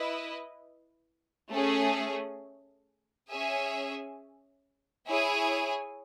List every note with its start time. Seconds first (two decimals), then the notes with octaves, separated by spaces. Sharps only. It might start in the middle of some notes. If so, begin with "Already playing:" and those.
Already playing: E4 B4 D#5
1.50 A3 C#4 G#4
3.29 C#4 G#4 C#5 E5 G#5
5.08 E4 G#4 C#5 G#5